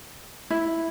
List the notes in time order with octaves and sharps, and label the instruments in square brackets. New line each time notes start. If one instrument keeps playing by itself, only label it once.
[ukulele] E4